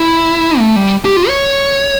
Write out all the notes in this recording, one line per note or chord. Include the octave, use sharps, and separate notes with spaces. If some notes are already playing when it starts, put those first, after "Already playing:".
Already playing: E4
A3
G3
G4
F4
C#5